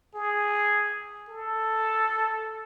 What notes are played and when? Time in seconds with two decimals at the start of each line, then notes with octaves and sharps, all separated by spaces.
0.15 G#4
1.29 A4